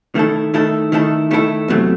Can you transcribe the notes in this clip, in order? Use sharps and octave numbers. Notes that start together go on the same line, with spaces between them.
D#3 A3 E4 A4
D#3 A3 E4 A4
D#3 A3 E4 A4
D#3 A3 E4 A4
E2 C3 F#3 A3